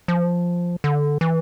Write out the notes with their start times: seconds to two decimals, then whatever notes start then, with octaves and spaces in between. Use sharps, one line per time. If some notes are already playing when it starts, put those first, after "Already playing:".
0.08 F3
0.84 D3
1.21 E3